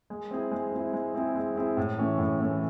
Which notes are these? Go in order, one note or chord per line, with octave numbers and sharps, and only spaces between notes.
G#3
C4 E4 G#4
G#3
C4 E4 G#4
G#3
C4 E4 G#4
G#3
C4 E4 G#4
A2
E3 A3 C#4
A2
E3 A3 C#4